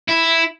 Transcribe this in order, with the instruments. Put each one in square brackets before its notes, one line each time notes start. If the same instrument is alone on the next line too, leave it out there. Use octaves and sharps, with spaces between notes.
[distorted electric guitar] E4